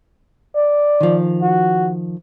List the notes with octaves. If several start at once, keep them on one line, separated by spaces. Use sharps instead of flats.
D5
D#3 F3
F#4